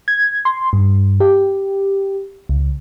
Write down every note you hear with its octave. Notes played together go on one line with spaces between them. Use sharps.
G#6
C6
G2
G4
C#2